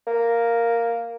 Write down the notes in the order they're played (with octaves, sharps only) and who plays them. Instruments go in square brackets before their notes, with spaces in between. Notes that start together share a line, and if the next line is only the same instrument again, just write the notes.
[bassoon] A#3